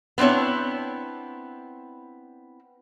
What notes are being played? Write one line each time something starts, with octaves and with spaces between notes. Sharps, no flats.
B3 C4 D4 E4 C#5